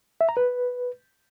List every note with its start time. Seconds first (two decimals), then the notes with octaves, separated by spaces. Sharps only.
0.21 E5
0.29 A#5
0.37 B4